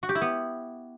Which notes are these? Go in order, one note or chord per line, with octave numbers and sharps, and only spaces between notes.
F#4
G4
E4
B3